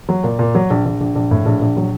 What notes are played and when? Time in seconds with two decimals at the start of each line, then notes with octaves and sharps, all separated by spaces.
0.09 F#3
0.24 A#2
0.39 A#2
0.55 F#3
0.70 A#1
0.86 A#1
1.01 A#1
1.16 A#1
1.31 A2
1.46 A#1
1.61 A#1
1.77 F#3